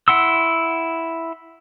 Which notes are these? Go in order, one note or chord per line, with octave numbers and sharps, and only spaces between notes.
E4 F#5 C6 E6